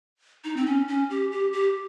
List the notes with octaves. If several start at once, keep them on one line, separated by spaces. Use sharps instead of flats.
D#4
C4
C#4
C#4
G4
G4
G4